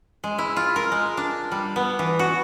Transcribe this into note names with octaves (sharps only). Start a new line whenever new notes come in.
G#3
E4
F4
A#4
G#3
D4
G3
B3
E3
F#4